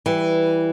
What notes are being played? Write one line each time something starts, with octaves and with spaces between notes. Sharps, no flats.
E3 G3